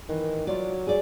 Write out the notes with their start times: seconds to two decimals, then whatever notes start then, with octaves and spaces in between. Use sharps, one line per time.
0.09 D#3 E3
0.47 F#3 F4 D5
0.87 G#4 D5